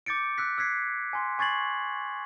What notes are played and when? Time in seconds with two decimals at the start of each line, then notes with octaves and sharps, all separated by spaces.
0.06 D6 G6 A6 C#7 D7
0.38 E6 F#6 B6
0.58 E6 F#6 G#6 B6 C7
1.13 G#5 C6
1.39 G#5 C#6 G#6 A6 C7 F#7